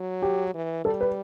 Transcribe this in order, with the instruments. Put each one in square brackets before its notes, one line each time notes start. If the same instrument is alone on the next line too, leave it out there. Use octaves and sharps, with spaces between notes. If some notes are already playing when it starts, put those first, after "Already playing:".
Already playing: [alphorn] F#3
[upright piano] G4
[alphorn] E3
[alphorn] G3 [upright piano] A4
[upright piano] B4